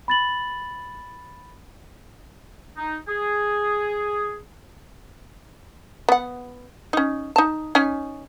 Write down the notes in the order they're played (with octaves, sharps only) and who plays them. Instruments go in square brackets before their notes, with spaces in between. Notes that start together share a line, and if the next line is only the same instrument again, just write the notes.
[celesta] B5 A6 F#7
[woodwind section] D#4
G#4
[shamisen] B3 F#5
C#4 D#4
D#4 A5
C#4 D#4 G#5